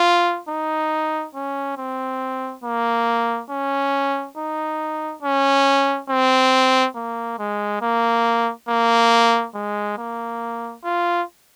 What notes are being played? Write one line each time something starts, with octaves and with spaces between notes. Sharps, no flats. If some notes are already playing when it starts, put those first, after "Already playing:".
Already playing: F4
D#4
C#4
C4
A#3
C#4
D#4
C#4
C4
A#3
G#3
A#3
A#3
G#3
A#3
F4